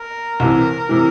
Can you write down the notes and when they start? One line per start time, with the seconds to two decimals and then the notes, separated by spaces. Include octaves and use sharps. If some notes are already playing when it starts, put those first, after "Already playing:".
Already playing: A#4
0.40 C2 C3 E3
0.89 C3 E3